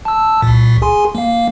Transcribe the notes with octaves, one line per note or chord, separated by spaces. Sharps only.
A5 E6
C2 A#2
G#4 G#5 C6
A#3 F5